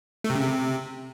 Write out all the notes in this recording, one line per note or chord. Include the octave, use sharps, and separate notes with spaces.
A3
C3
C#3
C3